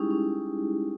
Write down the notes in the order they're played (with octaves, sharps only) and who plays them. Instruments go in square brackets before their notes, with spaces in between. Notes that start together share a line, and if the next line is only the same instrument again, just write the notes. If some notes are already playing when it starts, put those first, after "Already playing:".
Already playing: [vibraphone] G3 G#3 C#4 D#4 E4 G4 G#4
C#4